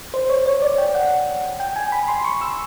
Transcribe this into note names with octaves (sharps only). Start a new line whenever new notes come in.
C5
C#5
C#5
D5
G5
F#5
G5
G#5
B5
C6
C6
C#6
E6